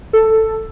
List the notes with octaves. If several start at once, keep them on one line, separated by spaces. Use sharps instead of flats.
A4